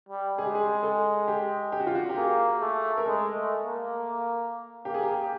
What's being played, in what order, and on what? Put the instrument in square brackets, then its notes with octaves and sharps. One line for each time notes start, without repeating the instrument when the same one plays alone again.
[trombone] G3
[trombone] G#3 [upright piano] G#4
[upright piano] G4
G#4
A4
G4
G4
F#4
F4
F#4
G4
[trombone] A#3 [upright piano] G#4
[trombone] A3
[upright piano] A#4
[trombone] G#3 [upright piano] A4
[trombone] A3
A#3
[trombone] A#3 [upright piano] G4
[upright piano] G#4
G4